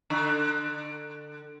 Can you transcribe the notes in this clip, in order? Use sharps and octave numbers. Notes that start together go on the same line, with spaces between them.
D3